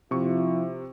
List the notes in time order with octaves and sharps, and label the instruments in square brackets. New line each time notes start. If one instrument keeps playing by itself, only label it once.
[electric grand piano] C3 C#6 [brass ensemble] F3 E4 F4